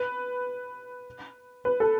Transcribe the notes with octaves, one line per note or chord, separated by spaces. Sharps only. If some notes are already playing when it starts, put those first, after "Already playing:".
Already playing: B4
B4
A4